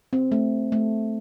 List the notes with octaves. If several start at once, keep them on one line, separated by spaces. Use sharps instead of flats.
C4
A3
A3